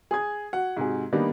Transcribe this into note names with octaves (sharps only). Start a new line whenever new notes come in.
G#4 D#6 G#6
F#4 F#5
G#2 C3 F#4 G#4
D#3 G3 A#3 B3 D4 D#4